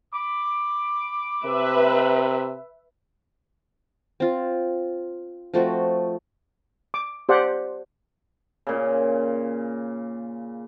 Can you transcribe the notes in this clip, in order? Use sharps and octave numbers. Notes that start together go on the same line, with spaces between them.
B5 D6
C3 B4 E5
C4 F4
F3 A3 C4 F#4
D6
G4 C5 D5 F#5
A#2 C#3